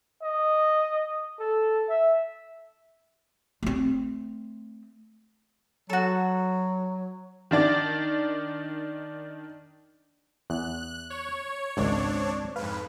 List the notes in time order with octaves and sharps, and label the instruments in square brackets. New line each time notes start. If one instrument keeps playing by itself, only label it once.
[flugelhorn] D#5
A4
E5
[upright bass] A3 C4
[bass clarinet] F#3 [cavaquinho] F#4 A4
[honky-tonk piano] D#3 D4 D5 A6
[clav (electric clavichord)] E2 [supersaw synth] F#6
[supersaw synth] C#5
[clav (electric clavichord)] G#1 C#2 [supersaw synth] C4 D4 C#5
[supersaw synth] F2 G#2 B4 [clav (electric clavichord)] F5